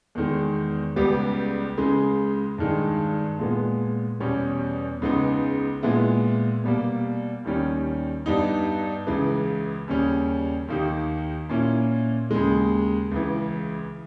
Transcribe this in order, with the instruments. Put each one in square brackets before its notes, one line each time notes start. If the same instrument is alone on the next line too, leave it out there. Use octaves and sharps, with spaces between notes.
[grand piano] E2 D#3 G#3
C#2 C#3 G3 B3 G4
C#2 C#3 G#3
G2 D#3 G#3
A#2 G#3 B3
E2 B2 G3 C#4
C#2 C#3 G#3 B3 D#4
A#2 G#3 B3 E4
B2 G3 A#3
D#2 D#3 G3 C#4
G2 G3 B3 D#4
C#2 C#3 E3
D#2 C#3 G3 C#4
D#2 D#3 A#3 D#4 G4
A#2 A#3 C#4 E4
D#2 C#3 G#3
C#2 C#3 E3